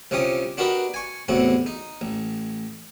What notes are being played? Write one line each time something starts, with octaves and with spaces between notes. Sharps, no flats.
C2 C3 C#4 F4 G4 D#6
D4 F#4 G4 A#4 B4 D#5
G#5 C#6
E2 A2 C3 F#4
D#4
A1